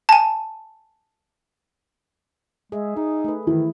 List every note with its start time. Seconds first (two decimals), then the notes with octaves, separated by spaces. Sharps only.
0.09 G#5 A5
2.72 G#3 G#4 D#5 E5
2.96 D#4 G#4
3.25 A3 B4
3.47 D#3 E3 E4